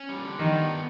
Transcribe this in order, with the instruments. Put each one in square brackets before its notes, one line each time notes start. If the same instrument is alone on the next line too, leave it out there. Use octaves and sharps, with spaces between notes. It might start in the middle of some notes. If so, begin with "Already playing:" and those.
Already playing: [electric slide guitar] C#4
G3
D3
[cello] D#3 [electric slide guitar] G3
[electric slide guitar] B3
D3